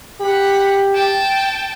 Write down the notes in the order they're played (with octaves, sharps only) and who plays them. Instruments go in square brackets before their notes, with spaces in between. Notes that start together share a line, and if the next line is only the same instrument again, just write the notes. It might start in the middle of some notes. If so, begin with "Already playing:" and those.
[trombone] G4 [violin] F#5 B5
[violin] G5 A5